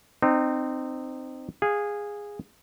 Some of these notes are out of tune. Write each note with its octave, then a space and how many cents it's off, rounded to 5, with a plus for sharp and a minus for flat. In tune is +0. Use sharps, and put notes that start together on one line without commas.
C4 -10 D#4 -30
G#4 -10 F5 +20